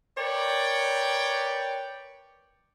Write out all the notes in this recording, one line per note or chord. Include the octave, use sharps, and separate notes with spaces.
A#4 B4 C#5 D5 G5